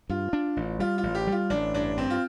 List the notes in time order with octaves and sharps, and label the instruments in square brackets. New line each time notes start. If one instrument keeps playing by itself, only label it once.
[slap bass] G2 [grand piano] F4
[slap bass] D4
A1
[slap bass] G3 [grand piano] F4
[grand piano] F4
[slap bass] A1
[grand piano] G4
[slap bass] G3
[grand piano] F4
[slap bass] A1 [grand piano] D4
[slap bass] G2 [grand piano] D4
[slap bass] G2 [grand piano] C4
[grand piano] F4